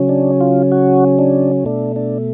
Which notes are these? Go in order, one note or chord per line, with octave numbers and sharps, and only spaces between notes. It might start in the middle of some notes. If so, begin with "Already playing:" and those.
Already playing: C#3 F#3 C#4
D4
F4
F#4
D4
B2 A3 D4
D4